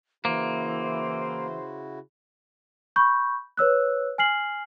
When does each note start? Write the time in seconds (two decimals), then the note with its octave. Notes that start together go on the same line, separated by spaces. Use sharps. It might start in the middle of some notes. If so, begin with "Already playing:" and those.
0.25 C#3 E3 A#3 E4 F#4 C5
2.96 B5 C#6 G6
3.57 B4 C#5 E6 F#6
4.18 G#5 F6 C7 F#7